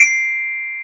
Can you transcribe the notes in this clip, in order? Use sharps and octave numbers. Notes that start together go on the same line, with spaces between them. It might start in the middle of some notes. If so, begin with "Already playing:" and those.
Already playing: C7 D7